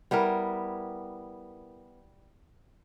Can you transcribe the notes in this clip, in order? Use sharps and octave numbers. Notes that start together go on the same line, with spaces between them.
G3 B3 E4 A#4